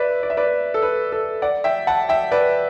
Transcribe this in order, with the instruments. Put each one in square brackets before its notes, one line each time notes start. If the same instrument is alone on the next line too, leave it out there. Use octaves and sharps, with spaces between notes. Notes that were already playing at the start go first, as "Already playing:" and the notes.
Already playing: [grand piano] B4 D5 E5
D5
E5
B4 D5
A4
B4
A4
D5 F#5
E5 G5
F#5 A5
E5 G5
B4 D5